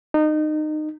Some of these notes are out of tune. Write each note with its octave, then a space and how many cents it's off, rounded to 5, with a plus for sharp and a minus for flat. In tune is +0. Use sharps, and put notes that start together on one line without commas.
D#4 -25